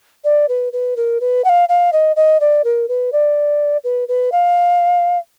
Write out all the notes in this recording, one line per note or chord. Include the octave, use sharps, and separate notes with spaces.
D5
B4
B4
A#4
B4
F#5
F5
F5
D#5
D#5
D5
A#4
B4
D5
B4
B4
F5